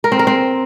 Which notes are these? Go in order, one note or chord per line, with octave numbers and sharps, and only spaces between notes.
A#4
C4
A#4
C4